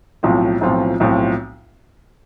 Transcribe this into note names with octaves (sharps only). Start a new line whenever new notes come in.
B1 A2 F3 C4 F4
B1 A2 F3 C4 F4
B1 A2 F3 C4 F4